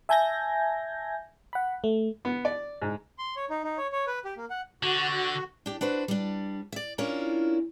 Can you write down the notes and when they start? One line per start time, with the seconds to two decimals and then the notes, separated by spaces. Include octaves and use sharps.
0.09 E5 G#5 A5 G6 G#6 A#6
1.53 F#5 B5
1.84 A3
2.25 B3
2.45 D5
2.82 G#2
3.19 C6
3.36 C#5
3.50 D#4
3.64 D#4
3.78 C#5
3.92 C#5
4.07 B4
4.25 G4
4.37 A#3
4.50 F#5
4.83 D3 F#4
5.66 D4 G4
5.81 D4 F#4 B4 C5
6.08 G3 D4
6.72 D5 E5
6.98 C#4 D4 E4 F4 A#4